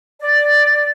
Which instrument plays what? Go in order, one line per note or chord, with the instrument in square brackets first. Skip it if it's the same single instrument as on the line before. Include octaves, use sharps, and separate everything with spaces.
[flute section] D5